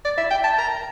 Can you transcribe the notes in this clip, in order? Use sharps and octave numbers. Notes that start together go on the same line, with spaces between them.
D5
E5
G5
A5
A#5